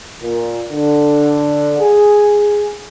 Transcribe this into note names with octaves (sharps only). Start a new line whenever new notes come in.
A#2
D3
G#4